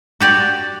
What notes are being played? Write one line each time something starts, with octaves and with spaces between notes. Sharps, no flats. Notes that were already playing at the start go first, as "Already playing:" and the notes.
F#4 G4 D5